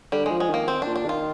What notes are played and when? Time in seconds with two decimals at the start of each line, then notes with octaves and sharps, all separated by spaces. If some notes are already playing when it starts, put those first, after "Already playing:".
0.12 D3 G3
0.26 F3 G#3
0.40 G#3
0.49 D#3 A#3
0.68 C4
0.82 A#2 D4
0.96 D4
1.05 D#3 F4